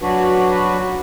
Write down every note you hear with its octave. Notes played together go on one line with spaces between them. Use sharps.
F#3 D4 F#4 B4